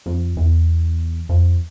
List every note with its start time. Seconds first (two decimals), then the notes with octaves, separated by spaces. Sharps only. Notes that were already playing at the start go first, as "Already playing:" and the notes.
0.06 F2
0.37 E2
1.29 F2